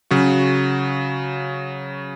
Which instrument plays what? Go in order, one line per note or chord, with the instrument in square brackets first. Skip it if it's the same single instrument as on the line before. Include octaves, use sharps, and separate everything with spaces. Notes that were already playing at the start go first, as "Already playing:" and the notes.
[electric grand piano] C#3 F#3 F#4